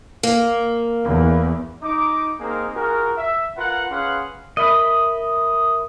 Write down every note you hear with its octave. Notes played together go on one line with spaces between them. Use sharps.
A#3
E2
D#4 D6
A#3 C4 D#4 G#4 A#4 C5
F4 F#4 G#4 A#4
E5
F4 A#4 B4 F#5
C#4 G#4 B4 F5 F#5 C6
A#4 D#5 E5 B5 D#6